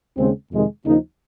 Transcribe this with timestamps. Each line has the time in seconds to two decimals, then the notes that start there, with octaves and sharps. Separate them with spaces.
0.17 D#2 C#3 G#3 C4
0.51 F2 C3 D#3 G#3
0.84 D#2 C#3 F3 A#3 D#4